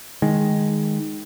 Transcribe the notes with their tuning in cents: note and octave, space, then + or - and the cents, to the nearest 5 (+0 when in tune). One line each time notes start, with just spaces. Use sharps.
D#3 +0 G#3 +0